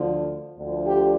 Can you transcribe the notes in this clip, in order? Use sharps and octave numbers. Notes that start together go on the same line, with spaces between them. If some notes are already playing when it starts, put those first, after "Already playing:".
Already playing: D2 D3 F3
D2 D3 F3
G4